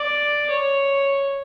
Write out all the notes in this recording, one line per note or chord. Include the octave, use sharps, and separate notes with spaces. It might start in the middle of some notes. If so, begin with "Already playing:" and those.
Already playing: D5
C#5